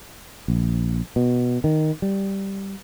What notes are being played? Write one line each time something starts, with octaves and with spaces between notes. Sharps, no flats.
A#1
B2
D#3
G3